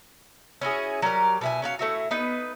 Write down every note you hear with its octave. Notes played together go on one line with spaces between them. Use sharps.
C#4 E4 F#4 G#4
F#3 G3 G4 A#4
B2 E4 G#5
C#4 F#4 F5
A3 E4 F#4
B3 D#4 B4